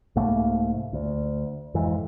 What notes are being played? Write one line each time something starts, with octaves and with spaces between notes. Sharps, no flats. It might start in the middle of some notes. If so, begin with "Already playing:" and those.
C2 G#2 A3 A#3
D2
F2 G#2 E3